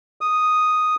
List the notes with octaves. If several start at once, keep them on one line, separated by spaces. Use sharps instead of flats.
D#6